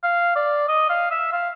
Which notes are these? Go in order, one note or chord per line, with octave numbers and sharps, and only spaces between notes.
F5
D5
D#5
F5
E5
F5